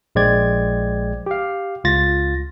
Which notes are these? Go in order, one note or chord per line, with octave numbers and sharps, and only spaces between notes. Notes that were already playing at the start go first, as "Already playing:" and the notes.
A#1 G#3 C5 D5 G5 G#6
G4 F5
C#2 F4 A6 A#6